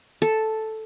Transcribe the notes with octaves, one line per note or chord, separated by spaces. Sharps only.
A4